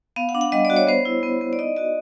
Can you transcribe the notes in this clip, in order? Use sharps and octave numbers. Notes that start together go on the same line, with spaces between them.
B3 F5
F#5
D4
F#5
G3 D#5
D5
F#4
C#5
B3 C5
E4
B3
B3
D5
D#4 D#5
F#4 D#5